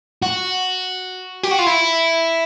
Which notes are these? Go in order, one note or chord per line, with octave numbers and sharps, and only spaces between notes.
F#4
G4
F#4
F4
E4